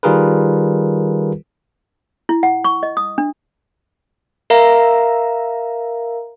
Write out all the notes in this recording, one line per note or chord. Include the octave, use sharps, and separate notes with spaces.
D#3 G3 F4 G#4 A#4 B4
E4
F#5
C#6
D#5
D#6
D4
A#4 E5 F5 A#5